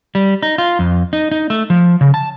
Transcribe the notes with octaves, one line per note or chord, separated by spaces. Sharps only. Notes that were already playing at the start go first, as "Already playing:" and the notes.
G3
D#4
F4
F2
D#4
D#4
A3
F3
C#3
A5